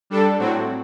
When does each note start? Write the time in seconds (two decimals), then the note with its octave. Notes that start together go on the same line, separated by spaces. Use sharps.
0.10 G3 D4 A4
0.38 A2 F#3 C4 F#4